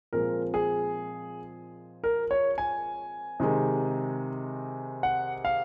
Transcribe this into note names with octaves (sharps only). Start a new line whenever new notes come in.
A#2 F3 G#3 C4 A#4
G#4
A#4
C#5
G#5
C3 D#3 G#3
F#5
F5